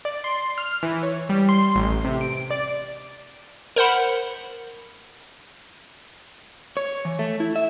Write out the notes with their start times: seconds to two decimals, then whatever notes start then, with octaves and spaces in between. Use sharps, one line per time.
0.05 D5
0.24 C6
0.58 F6
0.83 E3
1.03 C#5
1.29 G3
1.49 C6
1.75 A1
2.04 C3
2.21 D7
2.50 D5
3.76 A#4 C5 F#5 B5
6.77 C#5
7.05 E3
7.19 A3
7.40 E4
7.56 E5